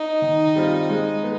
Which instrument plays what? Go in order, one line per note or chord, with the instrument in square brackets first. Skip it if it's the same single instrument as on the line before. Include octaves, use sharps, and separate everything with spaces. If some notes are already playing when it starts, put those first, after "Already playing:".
Already playing: [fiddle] D#4
[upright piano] D#3
G3 C4 F4
G#3
B3